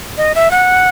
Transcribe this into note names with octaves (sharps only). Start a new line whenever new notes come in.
D#5
E5
F#5